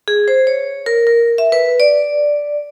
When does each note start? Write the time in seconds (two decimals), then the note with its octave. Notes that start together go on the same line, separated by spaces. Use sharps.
0.08 G#4
0.28 C5
0.47 C#5
0.86 A#4
1.07 A#4
1.38 E5
1.52 B4
1.80 D5